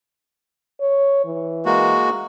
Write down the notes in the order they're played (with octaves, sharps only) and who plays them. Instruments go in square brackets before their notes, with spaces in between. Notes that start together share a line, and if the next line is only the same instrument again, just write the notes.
[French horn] C#5
E3
[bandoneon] G#3 A#3 F#4